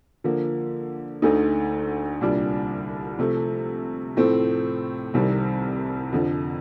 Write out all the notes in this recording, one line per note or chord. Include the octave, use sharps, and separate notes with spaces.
D3 F3 A#3
D2 D3 A3 D#4
C2 A#2 G3 D4
C3 F3 A3
A2 F3 A3 C4
C2 C3 D#3 G3
F2 D3 F3